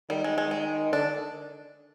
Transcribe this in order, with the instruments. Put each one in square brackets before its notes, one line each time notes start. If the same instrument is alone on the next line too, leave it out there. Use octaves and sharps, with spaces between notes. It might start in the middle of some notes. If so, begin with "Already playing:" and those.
[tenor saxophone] D#3 [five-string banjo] G3
[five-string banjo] G#3
G#3
G#3
[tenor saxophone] D3 [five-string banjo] D4